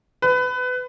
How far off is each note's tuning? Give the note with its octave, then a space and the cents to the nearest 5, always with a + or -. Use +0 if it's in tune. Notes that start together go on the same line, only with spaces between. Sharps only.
B4 +25